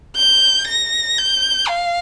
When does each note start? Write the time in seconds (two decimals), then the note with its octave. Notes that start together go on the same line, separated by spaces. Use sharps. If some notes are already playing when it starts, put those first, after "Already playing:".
0.16 G6
0.67 A#6
1.18 G6
1.68 F5